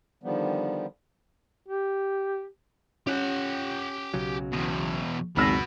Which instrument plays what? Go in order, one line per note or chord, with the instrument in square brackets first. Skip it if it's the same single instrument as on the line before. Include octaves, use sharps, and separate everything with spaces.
[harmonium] D3 D#3 F3 G3 B3
[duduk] G4
[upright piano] C#4 [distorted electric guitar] G4 F#5
[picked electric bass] B1 C#3 F#3
[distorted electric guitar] E2 B2
[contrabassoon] G#1 [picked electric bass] C#2 F#2 [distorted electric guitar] B2 B3 [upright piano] B5 E6 A#6